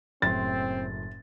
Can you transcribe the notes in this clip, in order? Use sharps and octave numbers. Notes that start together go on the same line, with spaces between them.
F#1 A2 C4 C6 A6